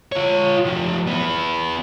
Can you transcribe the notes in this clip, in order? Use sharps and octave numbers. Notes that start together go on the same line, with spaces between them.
F4 C#5
F3 G4
B3 E4